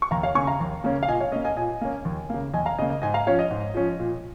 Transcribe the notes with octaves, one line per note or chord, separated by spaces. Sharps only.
C#6
D#2 F5 A#5
C#5 F5
C#3 A#3 C#4 G#5 C#6
F5 A#5
D#2
C#3 A#3 C#4
F5
A#2 D#5 G#5
C#5 F5
A#3 C#4 D#5
D#5 G#5
A#2 D#5 G#5
A#3 C#4
D#2
C#3 A#3
D#2 D#5 G#5
F5 A#5
C#3 A#3 D#5
D#5
G#2 D#5 G#5
F5 A#5
F3 C#4 C#5 F5
D#5
G#2
F3 C#4
A#2